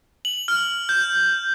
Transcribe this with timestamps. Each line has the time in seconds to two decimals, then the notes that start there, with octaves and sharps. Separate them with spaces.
0.25 F#7
0.48 F6
0.89 G6